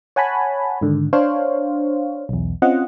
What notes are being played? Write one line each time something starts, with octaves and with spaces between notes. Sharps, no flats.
C#5 F#5 G#5 A5 B5
G#2 D3 D#3
D4 C5 C#5 F5
B1 E2
C4 C#4 F4 D#5 F#5